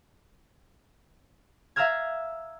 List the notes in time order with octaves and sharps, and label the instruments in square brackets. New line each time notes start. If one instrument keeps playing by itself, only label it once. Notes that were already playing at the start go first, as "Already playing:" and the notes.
[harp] E5 F5 A#5 E6 F6 G#6